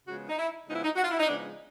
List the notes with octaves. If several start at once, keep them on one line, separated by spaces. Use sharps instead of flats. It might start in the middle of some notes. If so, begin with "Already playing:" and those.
C#3 F3 G#3 B3 F#4
D#4
E4
C#3 F3 G#3 B3 D#4
E4
D#4
F#4
F4
E4
D#4
C#3 F3 G#3 B3 D4